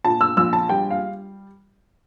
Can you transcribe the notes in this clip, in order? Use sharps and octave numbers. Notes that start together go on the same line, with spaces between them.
A#2 A5
E6
A#1 E6
A5
G3 G5
F5